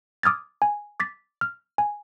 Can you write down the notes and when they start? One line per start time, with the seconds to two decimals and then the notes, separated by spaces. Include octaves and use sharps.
0.23 D6 D#6 F6 G#6 A6
0.62 G#5
1.00 D6 A6 B6
1.41 F6
1.78 G#5